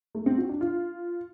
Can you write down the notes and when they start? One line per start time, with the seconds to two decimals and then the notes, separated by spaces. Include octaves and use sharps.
0.15 A3
0.26 C4
0.38 F#4
0.49 D4
0.61 F4